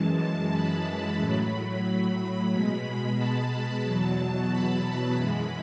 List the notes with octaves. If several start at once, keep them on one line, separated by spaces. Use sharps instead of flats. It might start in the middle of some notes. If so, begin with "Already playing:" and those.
Already playing: F#2 E3 G#3 A5
A5
B5
A2 F#3
B2 G#3
A5
E2 B2 F#3
B5
F#2 E3 G#3